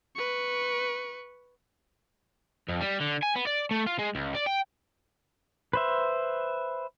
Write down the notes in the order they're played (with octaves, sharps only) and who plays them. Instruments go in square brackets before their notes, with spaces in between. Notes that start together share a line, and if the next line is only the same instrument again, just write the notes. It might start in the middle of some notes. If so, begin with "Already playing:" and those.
[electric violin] B4 C#6
[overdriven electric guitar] F2
G3
D3
G#5
B3
D5
A3
F4
G#3
C#2
D5
G5
[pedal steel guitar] B4 C5 E5